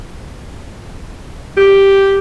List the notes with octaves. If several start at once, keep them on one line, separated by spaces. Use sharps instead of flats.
G4